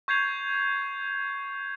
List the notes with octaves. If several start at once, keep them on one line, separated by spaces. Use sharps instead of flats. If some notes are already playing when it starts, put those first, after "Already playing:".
C#6 G6 G#6 C7 F7